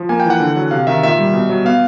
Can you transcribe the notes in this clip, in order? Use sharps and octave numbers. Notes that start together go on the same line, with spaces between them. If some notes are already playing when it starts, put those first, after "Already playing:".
Already playing: F3
A#3 G#5
G5
E3
F#5
D3
F#3
C3 F5
D#3 E5
A#2 E5
G3
B2
F#3
B3 F5